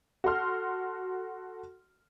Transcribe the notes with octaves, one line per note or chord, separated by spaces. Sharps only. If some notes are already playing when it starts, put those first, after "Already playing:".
F#4 A4 C6 F6